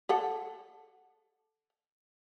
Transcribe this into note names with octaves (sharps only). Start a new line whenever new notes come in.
G4 A4 F#5